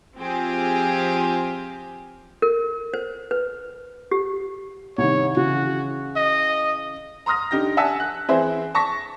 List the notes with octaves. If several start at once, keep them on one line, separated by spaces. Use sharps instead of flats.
F3 C4 F4 G4 G#4
A#4
C5
B4
G4
C2 D#3 C#5
C#3 E3 F#4
D#5
A#5 C6 D#6 F6 A#6
D3 D#4 G4 A#6
E5 F#5 G#5 A5 E6 B6
F#6
E3 C4 E4 G#4 C5 E5
A5 C#6 A#6 B6